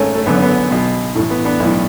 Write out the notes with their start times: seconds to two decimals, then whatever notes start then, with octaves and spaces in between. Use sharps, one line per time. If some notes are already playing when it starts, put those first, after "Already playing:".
Already playing: G#1 G#2 A3 C#4
0.15 A3
0.26 G#1 F#2 D3 B3
0.34 C#4
0.42 B3
0.70 B1 B2
1.15 A2 A3
1.19 A1
1.30 B3
1.45 B3 D4
1.59 B1 A2